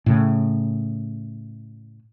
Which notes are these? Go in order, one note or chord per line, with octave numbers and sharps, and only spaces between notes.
A2 C#3